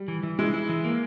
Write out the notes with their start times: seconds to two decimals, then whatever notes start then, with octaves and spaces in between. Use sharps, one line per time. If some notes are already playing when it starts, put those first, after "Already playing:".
Already playing: G3
0.08 E3
0.23 E3
0.39 G#3 E4
0.54 E4
0.69 E3
0.84 A#3